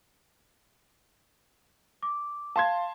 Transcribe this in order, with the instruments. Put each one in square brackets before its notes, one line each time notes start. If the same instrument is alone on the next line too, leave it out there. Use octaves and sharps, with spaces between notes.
[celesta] D6
[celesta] F5 [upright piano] A5 C6 G#6